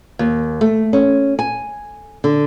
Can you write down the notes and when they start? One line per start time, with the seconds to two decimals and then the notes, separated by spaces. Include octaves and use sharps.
0.19 D#2
0.61 A3
0.93 C#4
1.39 G#5
2.24 D3